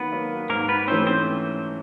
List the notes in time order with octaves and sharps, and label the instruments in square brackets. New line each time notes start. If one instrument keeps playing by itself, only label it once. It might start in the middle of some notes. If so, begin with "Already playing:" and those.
Already playing: [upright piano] D#3 F#3 A#3 [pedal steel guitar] B3 B4
[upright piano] F#3 A#3
[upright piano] G#2 [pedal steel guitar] A#3 A#4
[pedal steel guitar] B3 B4
[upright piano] E3 A3 C#4 [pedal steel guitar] C4 C5
[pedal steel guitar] C4 C5